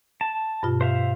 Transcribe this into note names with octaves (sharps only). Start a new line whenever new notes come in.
A5
G2 B2 F4
C5 E5 F5